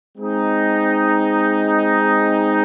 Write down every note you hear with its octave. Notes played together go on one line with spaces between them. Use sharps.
G#3 C4 D#4